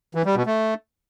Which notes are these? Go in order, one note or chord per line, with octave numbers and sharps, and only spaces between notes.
E3
G3
B2
A3